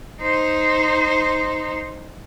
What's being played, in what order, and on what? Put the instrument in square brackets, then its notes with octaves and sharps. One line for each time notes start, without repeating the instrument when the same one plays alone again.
[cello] D#4 C5